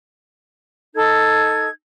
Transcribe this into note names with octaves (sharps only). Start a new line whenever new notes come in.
D#4 A4 G#6